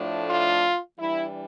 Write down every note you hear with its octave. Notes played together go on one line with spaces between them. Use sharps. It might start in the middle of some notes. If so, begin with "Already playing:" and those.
Already playing: A2 F3 A3 D4
F4
E3 G3 D4 E4